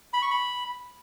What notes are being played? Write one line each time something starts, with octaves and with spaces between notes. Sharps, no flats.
B5
C#6
B5